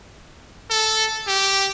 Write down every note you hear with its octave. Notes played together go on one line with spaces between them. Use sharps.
A4
G4